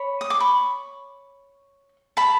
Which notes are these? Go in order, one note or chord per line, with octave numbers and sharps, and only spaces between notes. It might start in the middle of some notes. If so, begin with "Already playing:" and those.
Already playing: C#5 B5 C#6
D#6
D6
B5 C#6
A5 B5